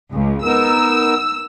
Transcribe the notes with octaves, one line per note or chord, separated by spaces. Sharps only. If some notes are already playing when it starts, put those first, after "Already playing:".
C#2
B3 D#4 A#4 E6